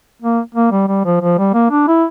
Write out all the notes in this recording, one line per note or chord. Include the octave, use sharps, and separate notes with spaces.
A#3
A#3
G3
G3
F3
F3
G3
A#3
D4
E4